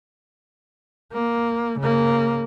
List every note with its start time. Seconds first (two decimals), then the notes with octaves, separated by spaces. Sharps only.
1.13 A#3
1.79 C#3 A#3